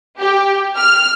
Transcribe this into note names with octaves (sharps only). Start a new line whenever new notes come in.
G4
F6